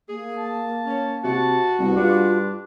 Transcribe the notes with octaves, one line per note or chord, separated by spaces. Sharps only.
A#3 G#4
A5
C#4
C3 F#4 A5
C2 B3
G2 D4 F4